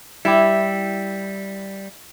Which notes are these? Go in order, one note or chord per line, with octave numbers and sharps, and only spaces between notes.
G3 E4 G4